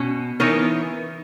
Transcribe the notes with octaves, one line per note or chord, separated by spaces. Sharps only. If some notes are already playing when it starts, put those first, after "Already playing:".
Already playing: B2 C#4
E3 B3 D#4 A#4 C#5